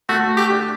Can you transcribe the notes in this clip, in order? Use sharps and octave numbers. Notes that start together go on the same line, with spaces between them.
A3 F#4
G4
D4